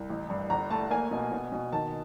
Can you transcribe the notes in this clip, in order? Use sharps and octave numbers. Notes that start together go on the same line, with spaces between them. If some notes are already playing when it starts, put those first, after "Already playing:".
Already playing: C2
A1
G2
G1 A#5
A3 A5
A#3 G#5
B2
B2
B2
D#3 A5